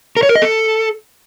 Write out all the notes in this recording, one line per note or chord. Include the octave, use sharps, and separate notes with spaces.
A#4
C#5
A#4
D#5
A4